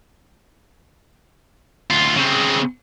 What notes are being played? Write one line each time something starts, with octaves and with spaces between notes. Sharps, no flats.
D2 F4
C#3 C4